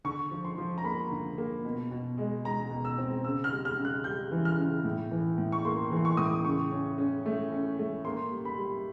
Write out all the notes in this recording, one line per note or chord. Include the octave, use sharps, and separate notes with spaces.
D3 C#6
F3
C6
F3
A#5
A#3 B5
D3
A#3
B2
B2
G#3
G#3 A#5
B2
E6
C4
C#3 E6
F6
G3
F6
C#3
F#6
G3 G6
E3
F6
C#3
A2
E3
A2
C#6
A#3 C6
C6
E3
C6
C#6
A2 D#6
D6
C#3 C#6
C#4
C#4
A3
C#4
A3
A#3 C6
G3
B5
G3